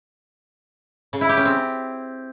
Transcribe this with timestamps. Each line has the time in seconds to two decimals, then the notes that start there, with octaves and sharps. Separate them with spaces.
1.13 C#3
1.21 E4
1.29 G4
1.37 C#4
1.45 C4